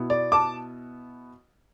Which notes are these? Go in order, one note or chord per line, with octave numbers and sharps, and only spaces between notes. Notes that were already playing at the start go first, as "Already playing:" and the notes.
Already playing: B2 B3 E4
D5
A5 D6